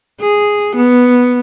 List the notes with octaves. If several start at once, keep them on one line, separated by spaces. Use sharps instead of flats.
G#4
B3